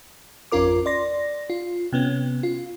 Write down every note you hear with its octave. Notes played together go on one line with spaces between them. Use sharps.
G#1 F2 C#4 F4 A#4 D6
D5 C6 A#6
F4
C3 B3 C#4
F4